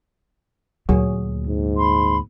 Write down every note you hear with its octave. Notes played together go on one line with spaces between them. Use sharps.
D2 A#2 F#3 G#4
G#2
B5 C6